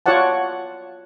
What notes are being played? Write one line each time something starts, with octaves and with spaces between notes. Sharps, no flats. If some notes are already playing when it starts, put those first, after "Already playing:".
F4 F#4 C#5 D5 F#5 A5